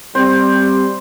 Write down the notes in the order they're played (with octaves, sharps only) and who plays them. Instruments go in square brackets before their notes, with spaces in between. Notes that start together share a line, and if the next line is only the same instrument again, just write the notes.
[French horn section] G3 [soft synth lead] C4 [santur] C5